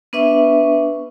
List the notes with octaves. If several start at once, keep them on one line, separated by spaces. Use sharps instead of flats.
B3 D4 B4 E5 C#6